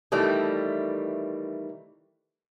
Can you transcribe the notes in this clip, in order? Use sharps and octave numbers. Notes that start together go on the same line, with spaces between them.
D#3 E3 G3 A3